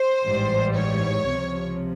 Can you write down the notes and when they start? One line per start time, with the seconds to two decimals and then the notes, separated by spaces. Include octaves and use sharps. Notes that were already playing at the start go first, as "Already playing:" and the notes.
Already playing: C5
0.24 A1 G#2 E3 G3
0.76 C#5
1.28 C#2 C3 F3